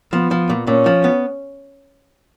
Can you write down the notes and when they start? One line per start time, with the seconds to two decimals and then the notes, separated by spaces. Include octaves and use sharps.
0.13 F3 B3
0.31 F3
0.49 A#2
0.67 A#2 C#4
0.86 F3
1.04 B3